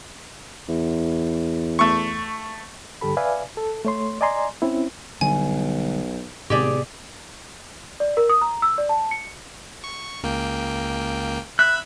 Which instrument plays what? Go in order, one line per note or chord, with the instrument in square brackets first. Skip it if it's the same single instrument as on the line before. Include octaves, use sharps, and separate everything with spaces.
[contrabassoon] E2
[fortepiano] A3 C#6
[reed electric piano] G2 D3 G4 A4 B5
B4 D5 E5 F5 G#5
A4
A3 C#5 C6
D5 D#5 G#5 A#5 C6
C4 C#4 E4
[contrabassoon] B1 [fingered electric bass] D3 G3 [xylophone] G#5
[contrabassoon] G#1 [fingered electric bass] A2 C3 B3 [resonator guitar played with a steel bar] G4 G#4 D5
[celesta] D5
A#4
D#6
A#5
E6
D5
A5
C#7
[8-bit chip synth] C#6
C#2 A#3 G5
[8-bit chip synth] E5 B5 [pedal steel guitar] F#6